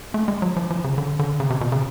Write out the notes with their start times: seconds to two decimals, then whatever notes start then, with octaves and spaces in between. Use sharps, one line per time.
0.14 A3
0.28 G#3
0.42 F#3
0.56 F3
0.70 F3
0.84 C#3
0.98 D3
1.19 D3
1.40 C#3
1.50 C3
1.61 B2
1.72 C#3